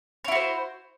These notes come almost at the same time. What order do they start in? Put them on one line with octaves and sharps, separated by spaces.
C#5 E4 F#4 C5